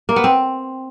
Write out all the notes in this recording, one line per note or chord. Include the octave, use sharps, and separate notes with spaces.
A#3
B3
C4